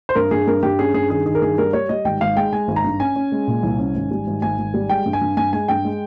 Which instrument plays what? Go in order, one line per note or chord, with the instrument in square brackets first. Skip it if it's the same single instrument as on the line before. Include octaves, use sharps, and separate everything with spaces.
[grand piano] C5
G2 A#4
G2 G#4
G2 A#4
G2 G4
C#4 G#4
G2 G#4
D#3 G#4
D#3 G#4
A#4
G2 G#4
G3 A#4
G3 C#5
G3 D#5
G#1 G5
G#1 F5
G#3 G5
G#3 G#5
G#1
A#5
G2
C#4 G#5
C#4
G#3
A#2
C2
C#4
G#1
G3
G#1
G#1 G#5
G#1
G3
G#3 G5
G2
G#5
G2
G2 G#5
G#3 G#5
G2 G5
G#3